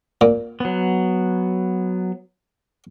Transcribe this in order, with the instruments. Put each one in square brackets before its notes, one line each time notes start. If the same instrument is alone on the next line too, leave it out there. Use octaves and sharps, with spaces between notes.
[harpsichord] A#2
[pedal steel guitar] F#3 B3